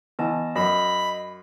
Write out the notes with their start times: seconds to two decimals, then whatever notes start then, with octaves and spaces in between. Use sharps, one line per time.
0.19 E3 B3 D#5 A5
0.56 F#2 D#5 B5